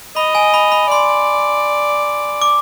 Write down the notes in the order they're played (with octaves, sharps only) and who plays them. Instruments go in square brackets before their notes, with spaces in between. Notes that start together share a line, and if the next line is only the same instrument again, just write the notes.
[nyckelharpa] D#5 [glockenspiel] B5
[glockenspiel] G#5
B5
B5
[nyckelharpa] D5 [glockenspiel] C6
[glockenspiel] D6